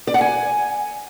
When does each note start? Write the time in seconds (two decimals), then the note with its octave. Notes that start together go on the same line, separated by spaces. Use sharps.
0.07 D5
0.14 F#5
0.21 G#5